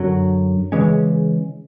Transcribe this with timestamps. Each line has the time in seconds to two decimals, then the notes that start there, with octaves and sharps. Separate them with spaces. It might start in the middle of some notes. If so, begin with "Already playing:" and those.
Already playing: F#2 D3 F#3
0.72 C#3 E3 G#3 C#4